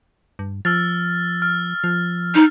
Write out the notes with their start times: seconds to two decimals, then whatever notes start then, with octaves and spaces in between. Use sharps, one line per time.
0.39 G2
0.65 F3 E6 F6 A6
1.42 F6
1.84 F3
2.35 D#4